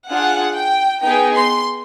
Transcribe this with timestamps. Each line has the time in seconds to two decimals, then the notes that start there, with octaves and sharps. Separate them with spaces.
0.09 D4 F4 G#4 F#5
0.55 G5
1.02 B3 D#4 G#4 G5
1.34 C6